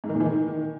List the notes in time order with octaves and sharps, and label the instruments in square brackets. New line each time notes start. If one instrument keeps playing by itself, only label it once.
[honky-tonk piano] G#2
D#3
A#2
E3
D#3